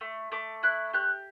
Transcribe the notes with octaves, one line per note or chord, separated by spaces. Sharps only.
A3
A3 D6
E4 F#6
G4 F#6